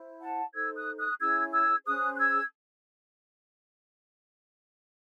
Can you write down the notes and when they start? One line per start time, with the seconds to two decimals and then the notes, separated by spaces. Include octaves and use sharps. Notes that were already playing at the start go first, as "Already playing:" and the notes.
Already playing: E4 C5
0.20 F#5 A5
0.54 D#4 A4 C5 E6 G#6
0.76 D#6 F#6
0.98 D#6 F#6
1.19 C#4 E4 G#4 C#5 E6 G#6
1.53 E6 G#6
1.86 C#4 G#4 C5 D#6 F#6
2.15 F#6
2.19 E6 G#6